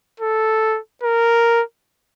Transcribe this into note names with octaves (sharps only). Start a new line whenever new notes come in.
A4
A#4